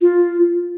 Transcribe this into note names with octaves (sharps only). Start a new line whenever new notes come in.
F4